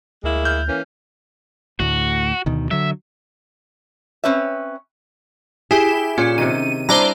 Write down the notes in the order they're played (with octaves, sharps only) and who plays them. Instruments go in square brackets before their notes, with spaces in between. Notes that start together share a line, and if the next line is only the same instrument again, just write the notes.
[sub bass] D2 [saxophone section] G#3 A#3 E4
[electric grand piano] F6 G6
[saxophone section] E3 A#3 C#4
[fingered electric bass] D2 A2 [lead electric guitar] F#4
[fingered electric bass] D2 B2 D#3
[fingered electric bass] D3 F#3 [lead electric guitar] E5
[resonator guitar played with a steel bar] C4 C#4 B4 C#5 E5
[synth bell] E4 G4 E7 [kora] G#4
[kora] A#2 [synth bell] C#4
[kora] C3 D#3 [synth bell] D#7
[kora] G3 D4 E4 [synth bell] C5 D5 A#5